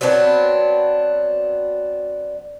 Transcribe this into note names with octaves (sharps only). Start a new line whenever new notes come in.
F#3 B3 C4 D4